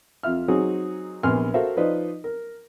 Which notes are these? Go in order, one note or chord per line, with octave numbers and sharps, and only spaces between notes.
F2 F4 E5 F6
F#3 C4 D#4 F#4 G#4
A#1 C3 B3 G#5 C6 F6
F#4 A4 A#4 C5 E5 F5
F3 D#4 B4 C5 D5 D#5
A#4